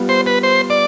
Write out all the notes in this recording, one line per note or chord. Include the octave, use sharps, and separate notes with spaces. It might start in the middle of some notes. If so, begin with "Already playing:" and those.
Already playing: G3 B3 F4
C5
B4
C5
D5